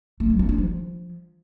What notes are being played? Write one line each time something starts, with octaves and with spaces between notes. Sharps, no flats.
A3
F#3
C#4
D4
F3